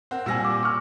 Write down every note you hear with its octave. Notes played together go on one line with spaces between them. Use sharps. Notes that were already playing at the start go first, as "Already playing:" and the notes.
C4 A#4 F#5
A#2 G3 G#5 E6 A#6
D6
C#6 F6